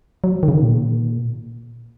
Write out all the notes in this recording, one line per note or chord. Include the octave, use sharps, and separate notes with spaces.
F#3
D#3
C#3
D#3
A#2